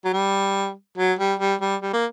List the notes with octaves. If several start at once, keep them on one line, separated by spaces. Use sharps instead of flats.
F#3
G3
F#3
G3
G3
G3
G3
A#3